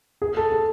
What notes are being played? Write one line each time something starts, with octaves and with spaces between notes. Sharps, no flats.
G#4
A4
G#4